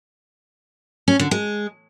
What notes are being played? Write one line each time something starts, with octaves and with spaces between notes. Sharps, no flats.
C#4
D3
G#3